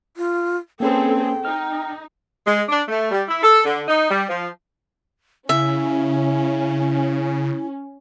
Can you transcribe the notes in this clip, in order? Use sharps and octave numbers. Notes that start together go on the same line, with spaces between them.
F4
A#3 C4 C#4 G#4 A4 B4 G5
D#4 F6
G#3
D4
A3
G3
E4
A4
D3
D#4
G3
F3
C#3 C#4 E4 E5